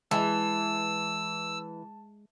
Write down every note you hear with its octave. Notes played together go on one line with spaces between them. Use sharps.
E3 G#3 A5 E6